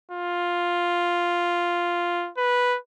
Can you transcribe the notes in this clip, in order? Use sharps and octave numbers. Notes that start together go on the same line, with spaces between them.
F4
B4